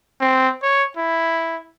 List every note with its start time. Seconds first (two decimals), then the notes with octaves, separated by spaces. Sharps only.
0.21 C4
0.63 C#5
0.97 E4